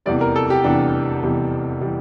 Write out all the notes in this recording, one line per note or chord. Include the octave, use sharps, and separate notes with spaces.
F1 E2 E3 G3 D5
A#4
A4
G4
F1 E2 E3 G3 D4
F1 E2 E3 G3
E3 G3